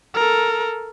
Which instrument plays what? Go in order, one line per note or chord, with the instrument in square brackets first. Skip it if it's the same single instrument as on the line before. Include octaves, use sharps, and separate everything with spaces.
[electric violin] A4 A#4